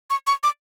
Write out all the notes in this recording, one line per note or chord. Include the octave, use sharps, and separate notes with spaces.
C#6
C#6
D6